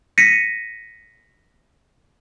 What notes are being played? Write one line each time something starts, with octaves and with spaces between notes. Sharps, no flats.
A#6 B6 C#7 D#7